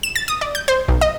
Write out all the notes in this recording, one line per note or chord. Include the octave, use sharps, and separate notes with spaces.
E7
A6
D#6
D5
G6
C5
B1
D#5